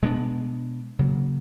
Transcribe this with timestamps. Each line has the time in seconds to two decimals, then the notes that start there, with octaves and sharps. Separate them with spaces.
0.02 B2 G#3 B3 D4
0.99 C#3 F#3 A#3